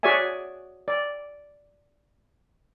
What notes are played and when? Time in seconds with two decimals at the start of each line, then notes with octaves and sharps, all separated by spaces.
0.03 F#4 G#4 C#5 D5 E5 G#5
0.88 D5